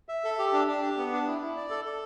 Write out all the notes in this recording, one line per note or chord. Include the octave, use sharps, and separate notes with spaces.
E5
A4
G4
D4
D4
G4
B3
D4
E4
E4
D5
A4
A4